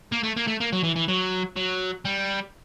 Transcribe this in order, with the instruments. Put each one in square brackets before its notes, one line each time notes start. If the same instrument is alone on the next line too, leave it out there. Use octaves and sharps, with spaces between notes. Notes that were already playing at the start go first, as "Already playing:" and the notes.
[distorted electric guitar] A#3
A3
A#3
A3
A#3
F#3
E3
E3
F#3
F#3
G3